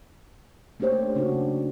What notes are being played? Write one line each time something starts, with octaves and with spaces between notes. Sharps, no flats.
A3 A#3 D4 G4 C5 C#5
C#3 D4 D#4 F#4